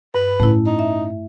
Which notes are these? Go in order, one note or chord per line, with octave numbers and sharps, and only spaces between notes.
G2 B4
A2 A3 C#4 E4
D#4
E5